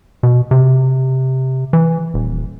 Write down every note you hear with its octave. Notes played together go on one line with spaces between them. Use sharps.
B2
C3
E3
D#1